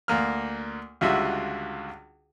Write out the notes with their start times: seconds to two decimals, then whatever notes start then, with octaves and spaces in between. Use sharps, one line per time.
0.08 D2 A#3 F6
1.01 C#2 D3 G3 F4 F#4 E5